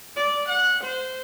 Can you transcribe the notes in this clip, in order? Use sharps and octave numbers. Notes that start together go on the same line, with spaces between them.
D5
F#5
C5